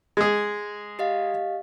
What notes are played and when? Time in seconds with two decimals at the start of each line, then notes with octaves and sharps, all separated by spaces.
0.17 G#3 G#4
0.99 G4 D#5 F5